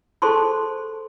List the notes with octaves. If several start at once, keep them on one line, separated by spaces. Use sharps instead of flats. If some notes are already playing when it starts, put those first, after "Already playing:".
G#4 A4 C5 A5 C6 C#6